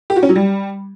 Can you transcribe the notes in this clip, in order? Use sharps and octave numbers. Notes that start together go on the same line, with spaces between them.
G4
F#4
C#4
F#3
G3